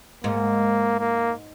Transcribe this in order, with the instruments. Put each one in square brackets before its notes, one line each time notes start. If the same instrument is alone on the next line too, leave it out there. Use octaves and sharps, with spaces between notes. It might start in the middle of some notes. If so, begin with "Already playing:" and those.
[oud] G#2 [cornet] A#3
[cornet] A#3